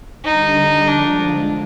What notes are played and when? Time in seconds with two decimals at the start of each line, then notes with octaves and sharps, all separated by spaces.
0.25 D3 G3 D4 D#4
0.87 D3 F3 G#3 D4